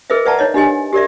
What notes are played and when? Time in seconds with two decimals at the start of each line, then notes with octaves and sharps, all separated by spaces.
0.10 G#4 A#4 B4 D#5 E5
0.25 B4 D5 E5 F#5 A5 A#5
0.39 D#4 C#5 D#5
0.54 D4 G4 D#5 G#5
0.93 G4 A#4 D5 E5